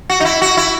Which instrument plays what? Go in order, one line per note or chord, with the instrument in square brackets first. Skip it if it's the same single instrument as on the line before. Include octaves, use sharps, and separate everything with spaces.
[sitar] F#4
D#4
E4
F#4
E4